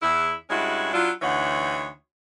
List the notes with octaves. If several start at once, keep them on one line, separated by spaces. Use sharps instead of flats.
E2 E4
G2 G#3 C#4 E4 F#4
F#3 D4 E4 F4
D2 E3 D#4 C#5 F#5